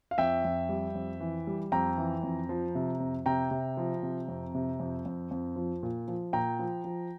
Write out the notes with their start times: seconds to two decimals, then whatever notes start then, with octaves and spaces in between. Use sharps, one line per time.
0.11 F5
0.18 F2 E5 G5
0.45 F2
0.69 G3
0.95 F2
1.20 E3
1.47 G3
1.72 F2 G5 A#5
1.98 E3
2.23 F2
2.49 F3
2.75 C3
3.00 F2
3.26 C3 G5 A#5
3.51 C3
3.77 F3
4.03 C3
4.28 F2
4.55 C3
4.80 F2
5.06 F2
5.31 F2
5.56 F3
5.83 A#2
6.08 F3
6.33 A#2 G5 A#5
6.59 F3
6.84 F3